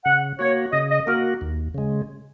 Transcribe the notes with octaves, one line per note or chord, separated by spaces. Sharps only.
C#3 F#5
A#3 F#4 C#5
C#3 D#5
D#5
A#3 F#4 A#4
D#2
C#3 G#3